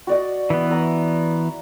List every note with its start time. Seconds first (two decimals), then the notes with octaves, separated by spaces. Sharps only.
0.07 F#4 D5 D#5
0.50 E3 B3
0.70 E5 A#5